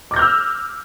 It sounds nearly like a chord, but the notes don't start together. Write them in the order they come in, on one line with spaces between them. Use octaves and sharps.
D6 A#6 G6 F6 E6